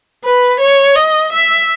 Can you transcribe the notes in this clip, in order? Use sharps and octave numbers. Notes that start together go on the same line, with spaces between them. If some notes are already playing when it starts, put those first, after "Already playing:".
B4
C#5
D#5
E5